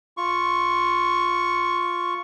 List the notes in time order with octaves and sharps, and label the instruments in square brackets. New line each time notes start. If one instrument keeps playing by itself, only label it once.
[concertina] F4 C#6